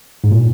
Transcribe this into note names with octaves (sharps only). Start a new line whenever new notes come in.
G#2
A#2